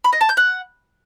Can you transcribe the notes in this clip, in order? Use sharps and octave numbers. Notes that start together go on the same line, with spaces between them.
B5
D#5
A5
G6
F#5